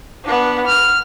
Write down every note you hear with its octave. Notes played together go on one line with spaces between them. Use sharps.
B3 D4
F6